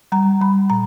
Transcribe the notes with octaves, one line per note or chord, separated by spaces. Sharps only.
G3 A#5
G3 B5
A#2 A#5